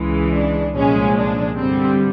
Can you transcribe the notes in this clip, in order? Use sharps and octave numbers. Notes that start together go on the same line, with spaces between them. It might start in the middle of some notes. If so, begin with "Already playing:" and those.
Already playing: C#2 C#3 E3 G#3
D4
C2 A#2 F3 G#3 C#4
D4
G2 D3 G3 C4